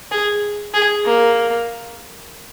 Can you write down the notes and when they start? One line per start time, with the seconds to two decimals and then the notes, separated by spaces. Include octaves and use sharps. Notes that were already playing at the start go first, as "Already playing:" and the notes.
0.11 G#4
0.74 G#4
1.05 A#3